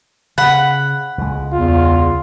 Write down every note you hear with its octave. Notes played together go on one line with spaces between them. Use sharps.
C#3 F#5 B5
C#2 G#3
E2 F4